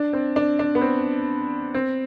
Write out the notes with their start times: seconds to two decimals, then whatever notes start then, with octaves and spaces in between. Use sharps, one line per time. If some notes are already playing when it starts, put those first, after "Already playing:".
Already playing: D4
0.13 C4
0.36 D4
0.59 D4
0.75 B3
0.81 C4
1.74 C4